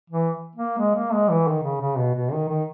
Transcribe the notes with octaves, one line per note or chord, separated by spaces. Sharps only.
E3
A#3
G#3
A#3
G#3
E3
D#3
C#3
C#3
B2
B2
D#3
D#3